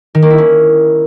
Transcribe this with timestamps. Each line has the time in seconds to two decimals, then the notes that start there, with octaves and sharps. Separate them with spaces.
0.15 D#3
0.22 A#3
0.30 E4
0.38 C#4